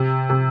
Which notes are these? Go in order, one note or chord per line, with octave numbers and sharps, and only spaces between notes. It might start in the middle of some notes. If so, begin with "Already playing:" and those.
Already playing: C3
C3